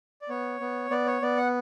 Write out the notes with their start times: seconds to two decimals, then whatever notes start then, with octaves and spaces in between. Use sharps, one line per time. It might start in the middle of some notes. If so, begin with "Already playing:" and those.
0.21 D5
0.29 B3 C#5
0.60 B3
0.90 B3 D5
1.07 C#5
1.22 B3 D5
1.37 F#5